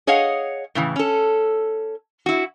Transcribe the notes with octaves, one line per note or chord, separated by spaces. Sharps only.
G#4 C#5 D#5 F5 F#5
A2 C#3 E3
C#4 A4
E4 F#4